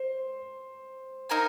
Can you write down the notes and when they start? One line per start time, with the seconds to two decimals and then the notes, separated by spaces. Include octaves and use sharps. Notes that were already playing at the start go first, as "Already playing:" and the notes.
Already playing: C5
1.29 D#4 A#4 F5 G#5